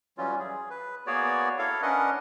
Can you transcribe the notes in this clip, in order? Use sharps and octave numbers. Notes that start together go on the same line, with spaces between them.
E3 F#3 G3 C#4 F4
G#4
B4
A#3 B3 F#4 G#4 C#5 D5
E4 A4 C#5 F5
C#4 D4 A#4 B4 D#5 F#5